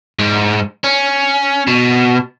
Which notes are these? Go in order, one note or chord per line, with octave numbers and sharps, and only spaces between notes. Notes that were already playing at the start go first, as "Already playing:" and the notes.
G#2
C#4
B2